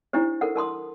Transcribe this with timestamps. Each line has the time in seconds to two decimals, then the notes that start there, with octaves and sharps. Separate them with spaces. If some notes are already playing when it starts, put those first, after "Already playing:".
0.13 D4 E4 G4 C5
0.41 A4 A#4 F#5
0.56 A#4 A5 C6 D#6